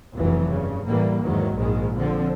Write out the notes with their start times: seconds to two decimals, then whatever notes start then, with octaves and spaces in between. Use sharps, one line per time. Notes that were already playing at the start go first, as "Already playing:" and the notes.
0.15 F1 F2 B2 E3 F#3
0.48 G2 C#3
0.86 A2 E3 G3 A#3
1.22 E2 G#2 D#3 F#3
1.56 A#1 G#2 D#3 G#3
1.97 D3 F3 C4